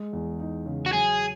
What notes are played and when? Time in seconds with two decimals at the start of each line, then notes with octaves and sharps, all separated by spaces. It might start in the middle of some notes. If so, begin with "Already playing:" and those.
Already playing: G#3
0.13 E2
0.40 D#4
0.66 C#3
0.86 F#4
0.93 F#3 G#4